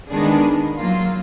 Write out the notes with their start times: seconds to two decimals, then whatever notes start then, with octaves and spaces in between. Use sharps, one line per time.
0.11 D#3 G#3 B3 D4 G#4
0.77 F#3 A#3 F4